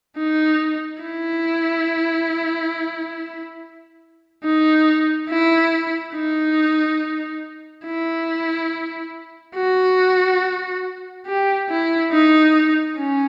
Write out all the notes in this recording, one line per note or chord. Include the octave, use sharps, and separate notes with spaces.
D#4
E4
D#4
E4
D#4
E4
F#4
G4
E4
D#4
C#4